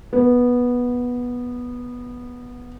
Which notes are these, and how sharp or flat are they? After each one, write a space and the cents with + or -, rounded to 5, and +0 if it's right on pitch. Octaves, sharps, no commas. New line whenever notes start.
B3 -10